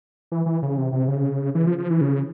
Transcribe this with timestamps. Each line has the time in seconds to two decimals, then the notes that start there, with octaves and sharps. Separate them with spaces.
0.32 E3
0.46 E3
0.62 C#3
0.77 C3
0.92 C3
1.08 C#3
1.55 E3
1.67 F3
1.78 F3
1.90 E3
2.01 C#3